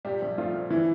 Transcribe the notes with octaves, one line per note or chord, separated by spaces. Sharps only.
A#2 G3 G4
A#1
F3 A3 F4
A#2
E3 E4